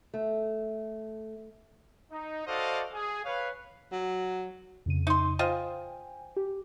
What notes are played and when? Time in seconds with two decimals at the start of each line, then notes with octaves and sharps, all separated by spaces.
0.14 A3
2.11 D#4
2.46 F#4 A4 C5 D5 D#5 F5
2.93 G#4
3.25 B4 C#5 F5
3.92 F#3
4.86 F2 C#3 D#7
5.07 D#4 C6
5.39 F4 C5 D#5 G5 G#5
6.37 G4